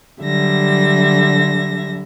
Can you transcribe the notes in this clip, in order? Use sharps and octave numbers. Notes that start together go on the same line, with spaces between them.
D3 F#3 G3 E5 A#6